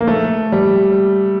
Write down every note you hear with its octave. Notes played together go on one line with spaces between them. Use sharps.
A#3
A3
G3